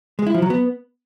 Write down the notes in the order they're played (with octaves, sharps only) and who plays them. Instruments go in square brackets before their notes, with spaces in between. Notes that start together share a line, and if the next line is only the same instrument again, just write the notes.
[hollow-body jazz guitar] G#3
E4
F3
F#3
B3